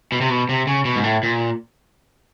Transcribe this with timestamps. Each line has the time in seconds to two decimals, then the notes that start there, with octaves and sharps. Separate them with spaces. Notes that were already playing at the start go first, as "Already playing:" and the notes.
0.12 B2
0.21 C3
0.30 B2
0.49 C3
0.67 C#3
0.85 B2
0.96 G#2
1.04 A2
1.23 A#2